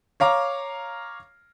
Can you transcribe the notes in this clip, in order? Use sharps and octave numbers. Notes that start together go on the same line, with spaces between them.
C#5 F5 A#5 D6